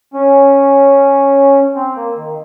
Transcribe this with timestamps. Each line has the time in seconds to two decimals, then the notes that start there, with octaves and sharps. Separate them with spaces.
0.14 C#4
1.76 C4
1.96 A#3
2.16 D#3